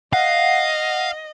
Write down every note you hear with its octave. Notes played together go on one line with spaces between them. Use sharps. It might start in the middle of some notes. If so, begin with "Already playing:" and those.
D#5 F5 F#5